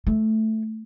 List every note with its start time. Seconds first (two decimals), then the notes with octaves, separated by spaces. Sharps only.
0.07 A3